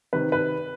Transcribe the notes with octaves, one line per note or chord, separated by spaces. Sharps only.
C3 D#3 B4
B4